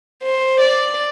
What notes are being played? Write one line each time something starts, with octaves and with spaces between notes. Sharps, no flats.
C5
D5